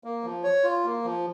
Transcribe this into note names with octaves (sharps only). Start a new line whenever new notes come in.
A#3
F3
C#5
F4
A#3
F3